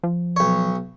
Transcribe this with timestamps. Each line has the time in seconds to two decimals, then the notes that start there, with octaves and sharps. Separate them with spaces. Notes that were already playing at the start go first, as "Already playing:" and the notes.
0.03 F3
0.36 B1 C#5